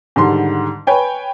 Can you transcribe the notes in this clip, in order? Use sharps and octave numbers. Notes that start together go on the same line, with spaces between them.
G#2 D3 D#3 G3 C6
B4 C#5 G5 G#5